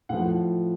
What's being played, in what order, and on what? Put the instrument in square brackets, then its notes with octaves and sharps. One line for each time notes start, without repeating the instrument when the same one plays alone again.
[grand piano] A2 F3 F#5